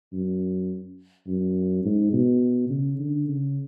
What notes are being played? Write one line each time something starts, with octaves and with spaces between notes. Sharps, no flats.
F#2
F#2
G#2
B2
C#3
D3
C#3